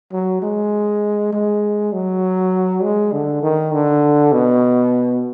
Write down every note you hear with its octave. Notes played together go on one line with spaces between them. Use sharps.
F#3
G#3
G#3
F#3
G#3
D3
D#3
D3
B2